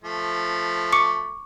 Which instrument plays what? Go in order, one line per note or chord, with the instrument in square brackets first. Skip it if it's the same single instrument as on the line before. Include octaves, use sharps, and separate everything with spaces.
[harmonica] F3 A3
[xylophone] C#6 D6 C#7